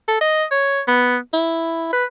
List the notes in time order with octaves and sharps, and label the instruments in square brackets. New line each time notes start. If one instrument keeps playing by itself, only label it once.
[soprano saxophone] A4
D#5
C#5
B3
E4
B4